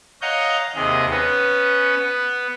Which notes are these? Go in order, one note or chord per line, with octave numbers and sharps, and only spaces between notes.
C#5 D#5 F5 F#5 A#5 G6
D#2 C3 G#4 D#5
B3 C#4
B3